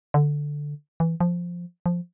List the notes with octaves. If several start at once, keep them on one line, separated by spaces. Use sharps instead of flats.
D3
E3
F3
F3